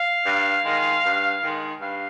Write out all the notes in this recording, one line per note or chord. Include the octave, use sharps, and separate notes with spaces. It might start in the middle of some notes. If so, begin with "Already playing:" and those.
Already playing: F5
G2
D#3 G#3
G2
D#3 G#3
G2 F5